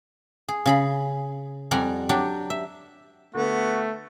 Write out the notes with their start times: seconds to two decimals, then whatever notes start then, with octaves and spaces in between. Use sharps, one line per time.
0.48 G#4
0.66 C#3 G#4 B5
1.71 F2 G3 F#5 G#5 A#5
2.09 F#3 D4 G4
2.50 E5
3.35 D3 A3 B3 F#4